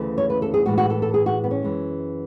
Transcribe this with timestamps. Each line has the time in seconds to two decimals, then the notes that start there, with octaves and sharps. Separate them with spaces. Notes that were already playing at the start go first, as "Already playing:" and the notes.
Already playing: D2 C#3 E3 A3
0.18 C#5
0.30 B4
0.42 A4
0.54 G#4
0.66 A2 E3 G#3 F#4
0.78 F#4
0.90 A4
1.02 A4
1.14 G#4
1.26 F#4
1.44 B3
1.51 C#4
1.62 F#2 E3 G#3